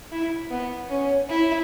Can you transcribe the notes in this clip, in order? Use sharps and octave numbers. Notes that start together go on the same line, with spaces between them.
E4
B3
C#4
E4